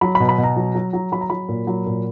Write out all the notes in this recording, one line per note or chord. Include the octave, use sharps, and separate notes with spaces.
F#3 B5
B5
B2
B5
B2
A#5
F#3
F#3
F#3
F#3 B5
A#5
F#3 B5
A#2
F#3
A#2